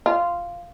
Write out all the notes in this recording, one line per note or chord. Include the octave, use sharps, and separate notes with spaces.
F4